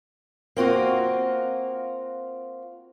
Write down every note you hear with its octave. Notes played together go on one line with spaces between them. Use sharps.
A#3 C4 F4 F#4